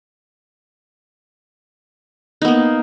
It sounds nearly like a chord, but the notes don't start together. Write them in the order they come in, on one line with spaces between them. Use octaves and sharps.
D#4 B3 A#3